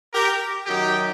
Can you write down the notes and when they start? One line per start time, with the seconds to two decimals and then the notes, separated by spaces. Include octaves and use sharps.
0.13 G4 A#4
0.66 F#2 D#3 F#3 D#4 G4